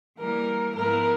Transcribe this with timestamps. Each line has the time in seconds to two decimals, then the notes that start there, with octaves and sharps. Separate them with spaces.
0.20 E3 G3 A#3 A#4
0.75 G#2 F3 G#3 B3 E4 A#4